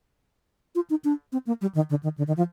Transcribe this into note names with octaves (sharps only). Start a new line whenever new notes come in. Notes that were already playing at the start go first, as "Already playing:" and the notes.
F4
D#4
D4
C4
A#3
G3
D#3
D3
D#3
D3
D#3
F3